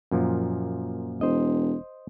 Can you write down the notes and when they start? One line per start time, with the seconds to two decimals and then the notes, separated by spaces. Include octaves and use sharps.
0.11 F#2 A#2 F3
1.21 E1 C5 D#5